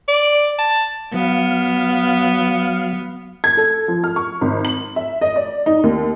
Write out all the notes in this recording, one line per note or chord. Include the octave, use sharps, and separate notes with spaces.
D5
A5
F#3 B3 F5
G#6
A4
F3
F6
C#6
G#1
F#7
E5
D#5
D5
D#4
D#2